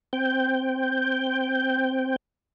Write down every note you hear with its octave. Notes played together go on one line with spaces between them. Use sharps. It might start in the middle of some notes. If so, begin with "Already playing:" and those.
C4 G5